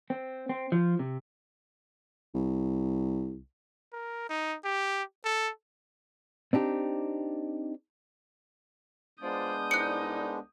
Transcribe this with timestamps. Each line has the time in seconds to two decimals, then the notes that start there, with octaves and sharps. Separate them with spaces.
0.10 C4
0.49 C4
0.72 F3
0.99 C3
2.34 C2
3.93 A#4
4.29 D#4
4.65 G4
5.25 A4
6.53 C4 D4 D#4 G4
9.22 G#3 B3 D4 F4 C5 D5 D#6 G6
9.71 C2 D#4 F#6 C#7